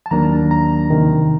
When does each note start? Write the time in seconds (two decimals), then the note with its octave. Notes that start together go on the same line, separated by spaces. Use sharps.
0.06 A5
0.11 D#2 D#3 F#3 A#3 D4 A#5
0.51 A#5
0.91 E2 C3 D#3